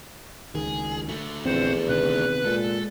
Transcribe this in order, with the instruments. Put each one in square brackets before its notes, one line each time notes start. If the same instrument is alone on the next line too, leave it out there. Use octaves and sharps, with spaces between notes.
[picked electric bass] C#2 D#3 [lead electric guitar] G#4
[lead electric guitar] D3 A3
[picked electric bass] A#1 F3 C4 [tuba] E2 [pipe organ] C5 F#5
[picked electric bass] C3 D#3 B3 [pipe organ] B4 F#6
[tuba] A#2 [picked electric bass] G#3 [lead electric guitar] A4